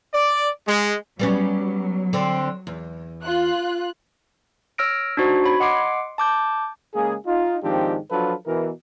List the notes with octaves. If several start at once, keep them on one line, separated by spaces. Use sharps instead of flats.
D5
G#3
F#3 G3 B3 C#4
D3 C4
E2
F4 F#6
C#5 E6 F6 A#6 D7
D4 D#4 F#4 C5
C#5 B5 G#6
D#5 F#5 C6 D6 C7 D7
A5 D6 G6
C#3 G#3 A#3 G#4
D#4 F4
G#2 D#3 F3 C4 D4 G4
F3 F#3 D4 F4 A4 B4
B2 E3 A#4